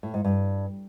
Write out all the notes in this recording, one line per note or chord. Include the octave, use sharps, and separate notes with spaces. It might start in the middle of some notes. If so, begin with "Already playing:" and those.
A2
G#2
G2